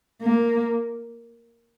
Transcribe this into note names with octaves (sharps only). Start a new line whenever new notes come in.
A#3